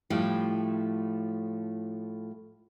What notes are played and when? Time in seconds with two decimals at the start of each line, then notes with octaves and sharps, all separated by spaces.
0.10 A2 F3 G3 A3 E4 G5